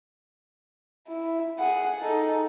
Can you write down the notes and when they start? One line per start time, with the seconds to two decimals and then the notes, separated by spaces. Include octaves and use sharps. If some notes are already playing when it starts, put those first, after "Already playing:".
1.08 E4
1.59 G#4 F#5
1.99 D#4 A4